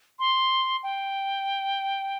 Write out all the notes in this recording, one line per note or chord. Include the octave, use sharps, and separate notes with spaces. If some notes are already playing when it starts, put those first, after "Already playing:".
C6
G5